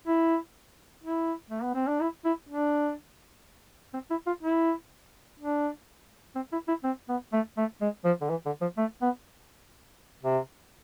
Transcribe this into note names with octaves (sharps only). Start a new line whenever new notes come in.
E4
E4
A3
B3
C4
D4
E4
E4
D4
C4
E4
F4
E4
D4
C4
E4
E4
C4
B3
A3
A3
G#3
F3
D3
E3
D3
F3
A3
B3
C3